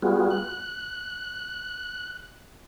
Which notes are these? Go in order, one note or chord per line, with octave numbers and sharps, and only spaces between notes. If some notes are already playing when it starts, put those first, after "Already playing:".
G3 B3 F4 F#4 G#4
F#6